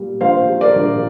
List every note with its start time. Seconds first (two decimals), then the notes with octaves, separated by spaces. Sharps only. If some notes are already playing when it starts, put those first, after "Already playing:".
Already playing: A#2 G3
0.21 A#1 C5 F5
0.48 G3
0.61 A#4 D5
0.75 A#1